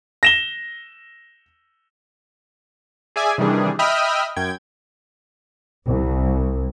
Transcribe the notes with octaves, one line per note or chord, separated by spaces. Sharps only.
A#6 E7 G7
G#4 D5 E5 G#5
C3 D#3 E3 G3 D4 G#4
D#5 E5 G5 B5 D#6 F6
F#2 G5 G#6
C2